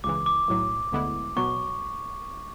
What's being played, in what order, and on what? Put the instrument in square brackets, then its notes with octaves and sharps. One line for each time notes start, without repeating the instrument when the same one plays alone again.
[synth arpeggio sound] C#2 C#3 E3 [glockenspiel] D6
[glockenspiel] D6
[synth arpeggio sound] B1 A2 F#3
D2 D3 G#3 B3 E4
[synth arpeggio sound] B2 F#3 B3 [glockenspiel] C#6